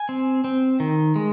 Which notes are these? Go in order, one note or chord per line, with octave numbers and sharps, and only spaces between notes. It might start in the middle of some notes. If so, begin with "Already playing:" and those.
Already playing: G#5
C4
C4
D#3
G#3